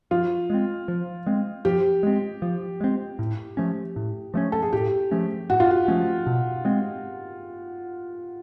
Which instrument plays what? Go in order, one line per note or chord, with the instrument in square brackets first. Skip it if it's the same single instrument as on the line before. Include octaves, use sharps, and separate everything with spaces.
[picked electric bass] F3 [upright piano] F4
[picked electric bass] G#3 C4
F3
G#3 C4
[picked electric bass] F3 [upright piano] G4
[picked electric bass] G#3 C4
F3
G#3 C4
A2
F3 A3 C#4
A2
F3 A3 C#4
[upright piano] A4
G#4
[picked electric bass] A2 [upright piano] G4
[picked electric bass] F3 A3 C#4
[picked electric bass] A2 [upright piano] F#4
[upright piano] F4
F#4
[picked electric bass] F3 A3 C#4
B2
G#3 C4